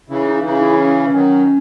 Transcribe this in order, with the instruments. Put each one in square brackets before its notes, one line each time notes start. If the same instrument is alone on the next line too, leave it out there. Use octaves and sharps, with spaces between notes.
[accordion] C#3 E3 [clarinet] C#4
[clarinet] D#4
[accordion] C#3 E3 [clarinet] D#4
[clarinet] E4
C#4
C#4
[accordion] D#3 F#3